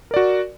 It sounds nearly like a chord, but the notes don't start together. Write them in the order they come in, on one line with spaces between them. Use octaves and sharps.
A#4 D5 F#4